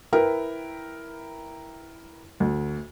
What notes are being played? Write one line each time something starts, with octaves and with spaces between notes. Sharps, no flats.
E4 A#4 B4 G5
D2